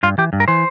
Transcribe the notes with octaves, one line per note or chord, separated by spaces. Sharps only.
G2 F4
E3 G4
G2
A#4
E3 C5